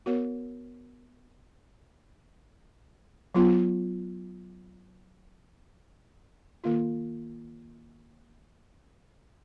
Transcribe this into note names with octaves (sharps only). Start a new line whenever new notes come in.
B3 F#4 A#4 C#5
F#3 B3 F4
D#3 A#3 F4